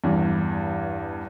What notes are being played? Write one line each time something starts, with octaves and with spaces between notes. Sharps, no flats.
E2 G2